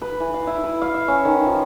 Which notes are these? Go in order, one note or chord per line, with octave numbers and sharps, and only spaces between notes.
B4
E3
F5
E4
B4
F5
E5
C#4
D#3
F3